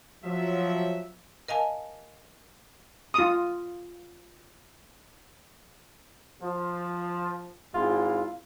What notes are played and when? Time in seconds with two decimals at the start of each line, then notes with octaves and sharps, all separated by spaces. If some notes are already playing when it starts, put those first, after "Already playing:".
0.24 F3 F#3 E5
1.48 A#4 D#5 F5 G#5 A5
3.14 F4 D#6
6.42 F3
7.74 G#1 G#2 E4 F4